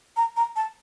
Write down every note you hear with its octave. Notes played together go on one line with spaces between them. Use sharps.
A#5
A#5
A5